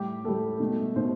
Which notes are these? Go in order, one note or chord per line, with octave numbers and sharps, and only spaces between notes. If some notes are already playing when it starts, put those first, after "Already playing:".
Already playing: A2 G3 G4
A2 G3 A4
B2 A3
B2 A3 C5